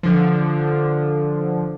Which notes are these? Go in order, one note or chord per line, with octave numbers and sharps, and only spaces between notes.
D3 F3